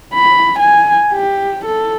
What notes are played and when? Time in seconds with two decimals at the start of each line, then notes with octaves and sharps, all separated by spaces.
0.14 B5
0.59 G#5
1.12 G4
1.65 A4